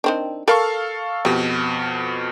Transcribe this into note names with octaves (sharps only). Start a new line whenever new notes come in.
D#3 C4 D4
A4 A#4 F5 B5 C#6
F2 B2 G4